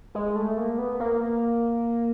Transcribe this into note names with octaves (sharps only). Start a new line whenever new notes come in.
G#3
A3
A#3
B3
A#3